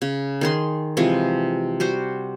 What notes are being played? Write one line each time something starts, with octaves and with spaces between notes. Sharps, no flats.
C#3
D#3 G#4 C6
C3 E3 F3 G#3
G3 F#4 C5